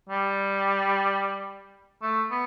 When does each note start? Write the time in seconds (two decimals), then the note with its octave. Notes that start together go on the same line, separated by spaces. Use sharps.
0.09 G3
2.02 A3
2.31 B3